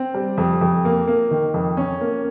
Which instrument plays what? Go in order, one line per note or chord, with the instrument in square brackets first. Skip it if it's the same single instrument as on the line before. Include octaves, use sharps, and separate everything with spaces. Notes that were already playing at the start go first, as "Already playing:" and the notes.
Already playing: [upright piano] C4
G3
F2
F2
A#3
A#3
D#3
F2
C#4
A#3